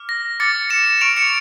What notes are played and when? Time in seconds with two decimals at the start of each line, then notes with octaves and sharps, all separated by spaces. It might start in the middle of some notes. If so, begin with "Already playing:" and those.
Already playing: D6 F6
0.09 A#6
0.40 D6 F6 A6 C#7
0.70 C#7 E7
1.01 C#6 F6 D7 F7
1.17 C#7 E7